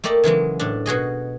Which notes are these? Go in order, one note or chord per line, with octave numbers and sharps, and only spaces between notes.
A3 A#3 G4 D5 D#5
C#3 E3 F#3 G#3
A2 D4
B2 F#4 G#4 D#5